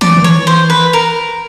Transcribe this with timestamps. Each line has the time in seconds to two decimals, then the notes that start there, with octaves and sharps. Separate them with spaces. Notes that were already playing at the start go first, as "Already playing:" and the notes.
0.01 F3 D5
0.09 E3
0.17 D#3
0.24 E3 C#5
0.47 C5
0.70 B4
0.93 A#4